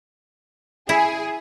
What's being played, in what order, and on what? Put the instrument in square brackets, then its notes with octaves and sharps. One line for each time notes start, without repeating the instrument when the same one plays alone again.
[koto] E4 [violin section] G#4 G#5